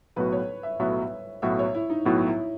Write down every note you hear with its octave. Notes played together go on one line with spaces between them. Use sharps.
B1 A2 F#3 B3 F#4 B4
C#5
E5
B1 A2 F#3 B3 F#4 E5
B1 A2 F#3 B3 F#4 E5
C#5
E4
D#4
B1 A2 F#3 B3 E4 F#4
E4